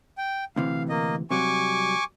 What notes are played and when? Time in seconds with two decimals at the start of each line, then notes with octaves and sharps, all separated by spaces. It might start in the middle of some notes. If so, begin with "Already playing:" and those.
0.18 G5
0.56 D2 C3 E3 F5
0.89 A#3 D#5
1.31 C3 F#3 G3 G#5 C#6 D6